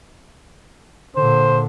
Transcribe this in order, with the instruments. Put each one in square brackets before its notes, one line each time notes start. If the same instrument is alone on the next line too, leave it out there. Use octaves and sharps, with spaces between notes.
[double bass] A#2 D3 [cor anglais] C5